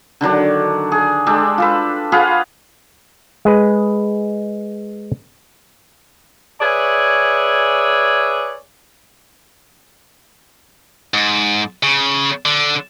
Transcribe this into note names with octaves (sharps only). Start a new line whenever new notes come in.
D3 D#3 F#3 D4
G#4
G#3 D4 G4 A4
F4 A4 B4
F4 G#4 B4 F#5
G#3 G#4 B4
G#4 B4 C#5 D5 E5 G#5
G#2
C#3
D3